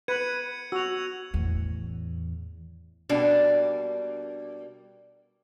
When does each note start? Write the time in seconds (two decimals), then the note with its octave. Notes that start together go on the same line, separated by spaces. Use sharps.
0.08 B4 G#6 C#7 D#7
0.72 F#4 E6 F7
1.34 E2 A2
3.09 B2 G3 A#3 D4